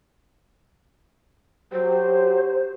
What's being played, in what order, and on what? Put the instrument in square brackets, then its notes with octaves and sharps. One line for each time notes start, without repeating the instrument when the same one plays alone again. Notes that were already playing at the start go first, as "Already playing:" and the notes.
[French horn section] F#3 G4 [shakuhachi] C5